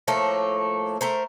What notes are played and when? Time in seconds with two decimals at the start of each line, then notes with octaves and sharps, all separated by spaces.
0.08 A2 F3 A3 A#3
1.01 A3 A#4 C5